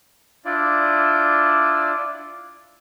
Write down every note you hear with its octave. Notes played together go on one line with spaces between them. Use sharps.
D4 E4 F4 D5